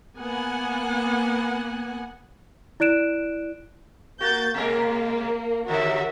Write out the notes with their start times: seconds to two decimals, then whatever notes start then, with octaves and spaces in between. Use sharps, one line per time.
0.17 A#3 B3 F#5 G#5
2.80 E4 D5 F#6 D7 E7
4.21 A#3 F#4 G6 A6
4.54 B2 G#3 A#3 A#4
5.68 D#2 G#2 D3 F#4 A#4 E5